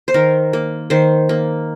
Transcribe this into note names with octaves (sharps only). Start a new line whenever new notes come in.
C5
D#3 A#4
A#3
D#3 C5
A#3